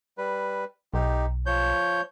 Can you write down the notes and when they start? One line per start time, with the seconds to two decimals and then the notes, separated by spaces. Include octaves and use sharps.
0.18 G3 B4
0.94 B1 D#4 G4
1.46 F3 C#5 G6